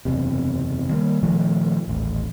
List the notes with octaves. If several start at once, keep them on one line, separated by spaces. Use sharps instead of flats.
F#1 E2 C3
D#3 G3 A#3
A#2 D#3 F3 A3
D#1 A1